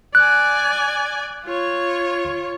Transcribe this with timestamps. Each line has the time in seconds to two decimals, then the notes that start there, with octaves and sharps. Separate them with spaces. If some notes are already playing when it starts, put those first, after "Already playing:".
0.15 D5 G#5 F#6
1.44 F4 C#5